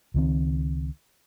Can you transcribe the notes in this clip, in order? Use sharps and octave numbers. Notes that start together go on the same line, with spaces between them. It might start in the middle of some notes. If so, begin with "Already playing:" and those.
C#2 D#3 C4